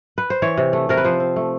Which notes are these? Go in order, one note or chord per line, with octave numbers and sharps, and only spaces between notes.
B4
C5
E3 C#5
C3
A3
C3 A#4
B4
F3 C5
C4
A3